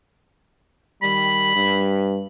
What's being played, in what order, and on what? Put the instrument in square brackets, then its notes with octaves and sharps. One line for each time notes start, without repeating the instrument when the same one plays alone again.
[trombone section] D#3 G3 [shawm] B5
[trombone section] G2